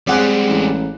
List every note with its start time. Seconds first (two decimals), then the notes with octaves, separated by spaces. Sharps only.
0.07 G3 G#3 C4 C#4 G#4 D5 F#5 F#6
0.49 A1